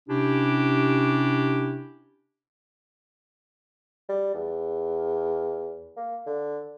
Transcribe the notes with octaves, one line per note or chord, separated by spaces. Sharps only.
C3 C#4 D4 E4 G4
G3
E2
A#3
D3